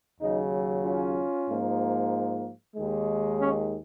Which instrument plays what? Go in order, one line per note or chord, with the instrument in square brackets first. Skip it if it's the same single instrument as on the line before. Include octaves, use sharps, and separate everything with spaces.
[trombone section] D#2 C#3 F#3 D#4
C#4 F4
G#2 F3 A#3
D#2 D#3 G#3
C#4